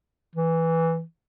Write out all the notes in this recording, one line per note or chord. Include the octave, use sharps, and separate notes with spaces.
E3